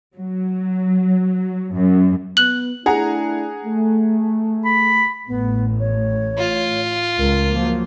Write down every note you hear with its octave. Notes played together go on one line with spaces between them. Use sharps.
F#3
F#2
B3 F#6 F#7
A3 D4 E4 G#4 F#5 A#5
A3
B5
A1 A2 B3
C#5
F4
C#2 A#4
F3 F#3 A#3